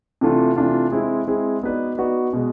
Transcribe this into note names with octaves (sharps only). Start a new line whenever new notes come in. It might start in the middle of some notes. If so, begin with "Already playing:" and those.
C3 E3 A3 D4 F4
C3 E3 A3 D4 F4
G#3 C4 E4 G#4
G#3 C4 E4 G#4
B3 D#4 F#4 B4 D5
B3 D#4 F#4 B4 D5
B2 G#3